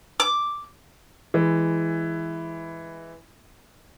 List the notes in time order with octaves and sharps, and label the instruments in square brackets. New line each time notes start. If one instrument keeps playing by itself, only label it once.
[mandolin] D6
[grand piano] E3 G#3